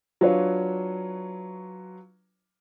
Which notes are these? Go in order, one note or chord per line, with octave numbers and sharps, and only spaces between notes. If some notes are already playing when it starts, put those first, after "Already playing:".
F#3 D4 F4 B4 C#5